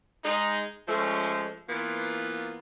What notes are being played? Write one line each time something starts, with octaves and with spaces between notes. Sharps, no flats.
G#3 D#4
F3 G#3 A3 C#4
E3 A#3 B3 F4